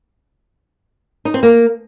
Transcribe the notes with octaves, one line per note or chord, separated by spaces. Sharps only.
D#4
C4
A#3